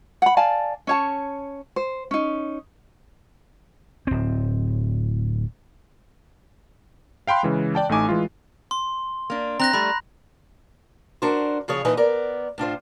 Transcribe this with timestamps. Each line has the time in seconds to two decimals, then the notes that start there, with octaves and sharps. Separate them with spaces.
0.22 F#5 B5
0.37 D5 F5 G#5 A5
0.87 C#4 C#5 A5
1.76 C5
2.11 C#4 D#4
4.07 D1 C4
7.27 F5 G5 B5 C6 F#6
7.43 C#3 E3 G#3
7.75 D5 G5 A5
7.89 A1 A3 D#4 G#5 D6
8.09 E3 G#3 F4
8.71 C6
9.30 A#3 D4
9.60 C4 A#5 F#6 A#6
9.73 G3 A3 B5
11.22 D4 F#4 A#4 C5
11.68 C#3 F3 G#4 C#5
11.85 A#2 E3 D#4 B4 D#5 G#5
11.97 B3 A#4 D5
12.58 A2 D4 F4 C5